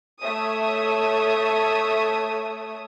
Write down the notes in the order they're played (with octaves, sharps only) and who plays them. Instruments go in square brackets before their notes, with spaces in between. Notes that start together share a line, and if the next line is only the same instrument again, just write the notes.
[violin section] A3 C#5 E5 D#6